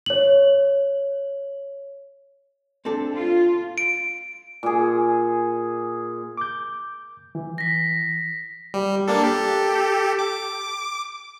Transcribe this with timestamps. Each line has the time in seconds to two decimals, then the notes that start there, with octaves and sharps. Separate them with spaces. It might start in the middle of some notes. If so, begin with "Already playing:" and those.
0.06 C#5 F#7
2.85 C4 D4 A4
3.15 F4
3.78 D7
4.63 A#2 G#4
6.37 D6 G6
7.35 E3
7.58 A#6 B6
8.74 G3
9.07 A#3 D4 A4
9.24 G4 A4
10.19 D6